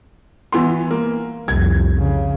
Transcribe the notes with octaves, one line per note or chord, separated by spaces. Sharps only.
E3 B3 C6
A#3
C2 F2 G#6
C#3